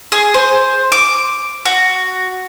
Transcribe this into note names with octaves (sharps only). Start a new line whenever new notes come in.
G#4
C5
D6
F#4